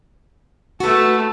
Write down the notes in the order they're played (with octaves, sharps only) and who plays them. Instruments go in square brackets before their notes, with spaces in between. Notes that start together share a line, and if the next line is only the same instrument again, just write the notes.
[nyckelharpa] A3 A4 [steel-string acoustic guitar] F#4 B4